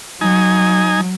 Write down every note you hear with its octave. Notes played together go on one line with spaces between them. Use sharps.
F#3 D#4 G#5